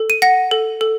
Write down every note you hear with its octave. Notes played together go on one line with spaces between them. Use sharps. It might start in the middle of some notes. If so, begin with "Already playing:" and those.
Already playing: A4
D#7
F#5 A#6 C#7
A4
A4